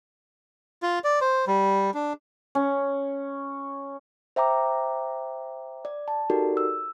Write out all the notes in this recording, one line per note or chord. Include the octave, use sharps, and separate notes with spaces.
F4
D5
C5
G3
D4
C#4
C5 E5 G5 A#5 D6
D5
A5
D#4 F#4 G4 A4 A#4 D5
E6